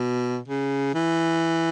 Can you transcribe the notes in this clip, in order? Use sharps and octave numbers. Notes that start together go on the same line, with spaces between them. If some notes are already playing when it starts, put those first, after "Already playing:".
Already playing: B2
C#3
E3